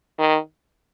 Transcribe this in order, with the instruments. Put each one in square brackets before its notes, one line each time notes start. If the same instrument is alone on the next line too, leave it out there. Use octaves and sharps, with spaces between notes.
[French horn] D#3